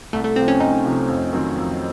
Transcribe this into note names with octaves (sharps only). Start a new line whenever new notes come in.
C2 A3
A3
C3 F3 C4
C#4
C2 D#4
C3 F3
F2
D#3 F#3 C4
F2